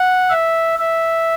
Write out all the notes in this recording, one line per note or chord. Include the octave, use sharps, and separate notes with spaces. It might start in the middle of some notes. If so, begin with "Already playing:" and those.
Already playing: F#5
E5
E5